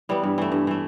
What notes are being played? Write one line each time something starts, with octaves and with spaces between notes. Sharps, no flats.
E3 G3 B3
G2
E3 A3
G2
E3 A3